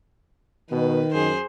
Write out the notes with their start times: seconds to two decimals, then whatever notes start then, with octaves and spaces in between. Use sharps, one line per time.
0.71 B2 D#3 B4
1.14 F#2 G#4 C5